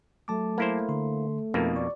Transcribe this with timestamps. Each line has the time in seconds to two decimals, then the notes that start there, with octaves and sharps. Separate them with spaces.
0.28 F#3 A3 A5 D6
0.58 A#3 E4 C5
0.89 D3 C6
1.54 F2 B2 A#3 D#4 A#4
1.76 D5 C#6